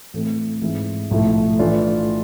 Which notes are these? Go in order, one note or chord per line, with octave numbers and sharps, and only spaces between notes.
A2 E3 A3 C4
G#2 E3 A3 C4 E4
B1 A2 F3 A3 E4
A2 E3 A3 D4 F4